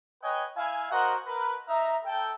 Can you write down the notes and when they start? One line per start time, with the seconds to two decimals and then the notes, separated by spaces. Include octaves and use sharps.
0.22 B4 C#5 D#5 G5 G#5
0.56 E4 F5 G#5
0.91 F#4 A#4 C5 D#5 F#5
1.26 A#4 B4
1.68 D#4 E5 A#5
2.05 A4 G5